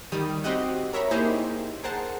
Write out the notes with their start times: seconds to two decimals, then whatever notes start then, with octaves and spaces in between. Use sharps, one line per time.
0.12 D#3 G3 D#6
0.44 C4 F#4 G4 D#5 F#5
0.93 A#4 C#5 E5 A#5 B5
1.11 A#3 D#4 E4 G4 G#4 C5
1.84 G#4 A#4 C5 F#5 A5